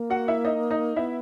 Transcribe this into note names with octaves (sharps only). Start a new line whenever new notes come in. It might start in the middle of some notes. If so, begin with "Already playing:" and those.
Already playing: A#3
F#4 F#5
E4 E5
D#4 D#5
D#4 D#5
B3 E4 E5